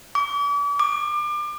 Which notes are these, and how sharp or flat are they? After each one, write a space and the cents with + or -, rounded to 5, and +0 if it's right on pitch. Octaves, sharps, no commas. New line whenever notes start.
D6 -40
D6 +30